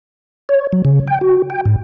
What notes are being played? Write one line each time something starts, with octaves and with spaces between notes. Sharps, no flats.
C#5
F#3
C#3
G5
F#4
G5
G#2